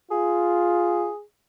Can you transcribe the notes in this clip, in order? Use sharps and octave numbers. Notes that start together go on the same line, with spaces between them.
F4 G#4